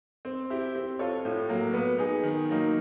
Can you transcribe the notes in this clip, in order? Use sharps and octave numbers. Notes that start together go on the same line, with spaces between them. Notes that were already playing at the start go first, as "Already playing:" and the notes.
C4
E4 G4
C4
F4 A4 C#5
A2
F#3 A#3
B3
D#4 G#4
D#3
F#3 A#3 D#4